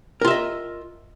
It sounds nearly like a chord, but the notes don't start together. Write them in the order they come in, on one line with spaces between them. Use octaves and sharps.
A#4 F4 E5 D#5